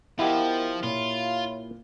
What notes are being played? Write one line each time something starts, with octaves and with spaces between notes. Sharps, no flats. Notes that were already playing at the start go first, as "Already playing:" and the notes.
F3 B3 E4 G4 A#4 D#5 F#5 G5
A#2 F4 C#5 E5 B5